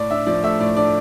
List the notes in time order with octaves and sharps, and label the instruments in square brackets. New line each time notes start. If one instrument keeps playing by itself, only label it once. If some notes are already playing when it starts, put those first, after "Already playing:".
Already playing: [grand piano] A2 D5
D4 E5
F3 D5
A3 E5
A2 D5
D4 D5